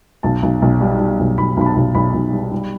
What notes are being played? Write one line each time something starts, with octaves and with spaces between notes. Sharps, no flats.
B1 A5
B1
B1
G3
G3
B1
B1 B5
B1 B5
A5
B1
B1 B5
B1
G3
G3